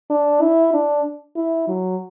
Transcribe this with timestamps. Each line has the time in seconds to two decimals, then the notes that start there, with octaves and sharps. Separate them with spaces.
0.10 D4
0.41 E4
0.74 D4
1.36 E4
1.68 F#3